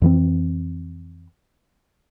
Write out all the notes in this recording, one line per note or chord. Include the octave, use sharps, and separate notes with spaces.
F2 E3 C4